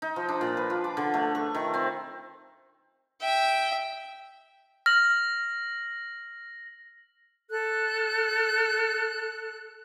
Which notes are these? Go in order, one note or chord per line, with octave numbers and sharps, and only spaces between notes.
D#4
F3
D4
A#2
B4
F4
D6
D3
A3
C#6
D#3
C4
E5 G5
F6 A#6 F#7
A4 F#6